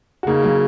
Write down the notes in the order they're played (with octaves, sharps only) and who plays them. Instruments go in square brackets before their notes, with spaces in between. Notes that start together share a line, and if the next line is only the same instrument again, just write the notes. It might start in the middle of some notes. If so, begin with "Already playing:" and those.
[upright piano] F#4
[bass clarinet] C#3 [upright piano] A#3 D#4
[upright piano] F#3 A#3